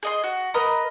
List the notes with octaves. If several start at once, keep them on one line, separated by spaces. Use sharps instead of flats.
G#4 D#5 C6
F#4
A#4 B4 D#5 A#5